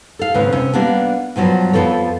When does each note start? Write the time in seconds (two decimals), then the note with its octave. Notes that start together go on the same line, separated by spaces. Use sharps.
0.19 A4 F5
0.34 D#2 G#2 C#3 C4 B4
0.53 C3 C#4
0.74 G3 A#3 B3 D4
1.36 G2 B2 F3 F#3
1.73 F2 E3 F3 B3 A4 C#5